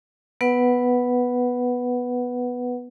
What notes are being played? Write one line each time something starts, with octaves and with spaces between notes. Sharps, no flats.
B3 B4 F#5